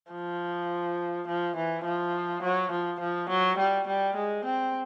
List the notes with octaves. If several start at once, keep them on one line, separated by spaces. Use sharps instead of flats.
F3
F3
E3
F3
F#3
F3
F3
F#3
G3
G3
G#3
C4